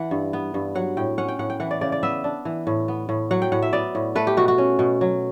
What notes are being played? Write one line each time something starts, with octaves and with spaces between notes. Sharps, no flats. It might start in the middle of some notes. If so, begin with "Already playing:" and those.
Already playing: E3 F#5
G2
B3
G2
F#3 F#5
A2 G5
C#4 F#5
G5
A2 F#5
G5
E3 F#5
D5
C#3 D5
D5
B3 E5
D4
E3
A2
B3
A2
F#3 F#5
G5
A2 F#5
E5
B3 D5
A2
A3 B4
G4
B2 F#4
F#4
C#4
B2
F#3